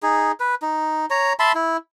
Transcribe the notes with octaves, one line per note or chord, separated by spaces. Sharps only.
D#4 G#4
B4
D#4
C#5 A#5
E5 A5 B5 C6
E4